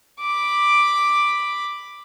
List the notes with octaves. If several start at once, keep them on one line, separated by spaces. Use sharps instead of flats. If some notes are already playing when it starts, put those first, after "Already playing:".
B5 D6